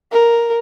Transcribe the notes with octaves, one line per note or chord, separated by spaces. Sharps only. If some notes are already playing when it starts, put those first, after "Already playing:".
A#4